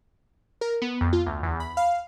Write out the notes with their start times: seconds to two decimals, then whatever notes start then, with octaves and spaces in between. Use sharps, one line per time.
0.61 A#4
0.82 B3
1.01 F2
1.13 F4
1.26 D2
1.43 E2
1.60 B5
1.77 F5